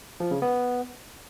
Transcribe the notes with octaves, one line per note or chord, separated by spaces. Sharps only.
F3
C#3
B3